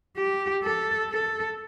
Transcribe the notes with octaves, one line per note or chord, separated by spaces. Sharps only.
G4
A4
A4